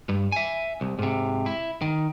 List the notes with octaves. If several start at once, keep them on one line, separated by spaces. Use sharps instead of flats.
G2
E5 G#5
C2
G#2 C3
E4
D#3